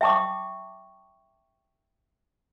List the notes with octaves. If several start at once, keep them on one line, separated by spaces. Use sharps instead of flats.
E5 G5 A5 C#6 D6